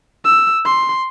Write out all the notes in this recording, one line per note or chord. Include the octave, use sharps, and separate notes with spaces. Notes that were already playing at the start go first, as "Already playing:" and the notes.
E6
C6